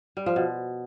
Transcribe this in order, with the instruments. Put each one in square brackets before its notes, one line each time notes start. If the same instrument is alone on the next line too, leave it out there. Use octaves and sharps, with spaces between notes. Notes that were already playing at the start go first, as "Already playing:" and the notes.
[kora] G3
F3
B2